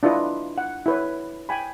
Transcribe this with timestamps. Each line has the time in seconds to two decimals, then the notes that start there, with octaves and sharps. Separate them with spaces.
0.03 D4 E4 F4 B4 D#5
0.58 F#5
0.86 E4 B4 C#5
1.49 G5 G#5 B5